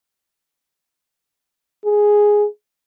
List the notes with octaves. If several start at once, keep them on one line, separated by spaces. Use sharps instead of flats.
G#4